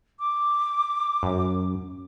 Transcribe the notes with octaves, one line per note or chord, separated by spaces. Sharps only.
D6
F#2